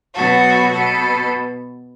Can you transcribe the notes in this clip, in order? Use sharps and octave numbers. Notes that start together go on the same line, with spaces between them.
B2 F#3 B3 F#4 A4
B2 B3 A4